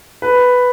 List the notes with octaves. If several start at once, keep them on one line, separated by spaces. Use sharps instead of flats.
B4